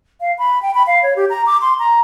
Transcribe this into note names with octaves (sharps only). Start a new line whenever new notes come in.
F5
B5
G5
B5
F5
C#5
G4
A#5
D6
C6
A#5